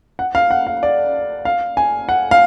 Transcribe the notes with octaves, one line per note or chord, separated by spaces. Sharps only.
F#5
F5
F#5
F5
D5
F5
G#5
F#5
F5